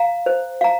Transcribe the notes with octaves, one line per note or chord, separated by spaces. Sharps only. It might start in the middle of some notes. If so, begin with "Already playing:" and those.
Already playing: F5 A#5
C5
F5 A#5